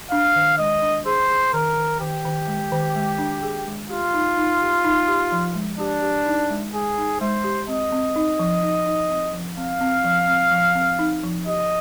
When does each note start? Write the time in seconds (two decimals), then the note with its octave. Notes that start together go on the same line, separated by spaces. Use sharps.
0.11 D4 F5
0.36 D#3
0.58 G#3 D#5
0.82 D4
1.06 G#4 C5
1.30 G#4
1.53 D#3 A#4
1.77 D#3
2.00 D#3 G4
2.25 D#3
2.47 G#3
2.72 D#3
2.96 G#3
3.18 D4
3.42 G#4
3.67 G#3
3.89 F4 G4
4.14 D#4
4.38 D#4
4.61 G4
4.85 D#4
5.08 G4
5.32 F3
5.55 G#3
5.79 D4 G4
6.02 G4
6.26 D#4
6.50 G#3
6.74 G#3 G#4
6.98 D#4
7.20 G#3 C5
7.44 G4
7.68 C4 D#5
7.92 C4
8.16 D#4
8.39 F3
8.63 D#4
8.86 D#4
9.10 C4
9.33 F3
9.57 C4 F5
9.81 C4
10.04 F3
10.28 C4
10.52 F3
10.75 C4
10.99 D#4
11.24 F3
11.46 G4 D#5